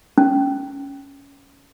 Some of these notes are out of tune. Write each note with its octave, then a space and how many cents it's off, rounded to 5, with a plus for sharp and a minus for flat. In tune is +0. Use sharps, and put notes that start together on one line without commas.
C#4 +10